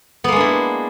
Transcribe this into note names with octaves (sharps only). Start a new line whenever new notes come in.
G#3 A#3 B3 D4 E4